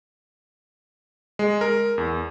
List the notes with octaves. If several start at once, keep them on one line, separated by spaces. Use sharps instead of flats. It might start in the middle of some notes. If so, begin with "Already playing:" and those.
G#3
A#4
E2